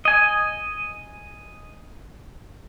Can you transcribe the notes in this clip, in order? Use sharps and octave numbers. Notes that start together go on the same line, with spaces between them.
D#5 G#5